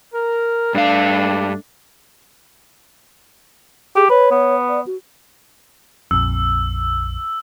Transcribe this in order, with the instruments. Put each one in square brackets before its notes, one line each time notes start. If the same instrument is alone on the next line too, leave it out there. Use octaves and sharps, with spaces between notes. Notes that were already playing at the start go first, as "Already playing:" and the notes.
[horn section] A#4
[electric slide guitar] G2 F5 [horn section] A3 D4
[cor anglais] G4 [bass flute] G#4
[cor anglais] B4 [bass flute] C#5
[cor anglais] B3
[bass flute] D5
F#4
[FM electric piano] A#1 F2 [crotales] E6